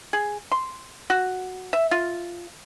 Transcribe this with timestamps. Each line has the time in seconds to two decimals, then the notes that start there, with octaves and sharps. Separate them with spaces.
0.13 G#4
0.52 C6
1.10 F#4
1.73 E5
1.91 F4